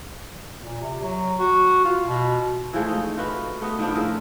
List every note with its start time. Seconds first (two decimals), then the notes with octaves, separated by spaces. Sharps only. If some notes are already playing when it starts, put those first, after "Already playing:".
0.62 A#2
0.82 C3
1.02 F#3
1.39 F#4
1.85 F4
2.07 B2
2.73 E3 F3 G#3 A3
2.88 D#4
3.17 F4 F#4 B4
3.61 A3 B3 B4 D#5
3.79 D#3 F3 B3 D4
3.95 A2 G#3 A#4 E5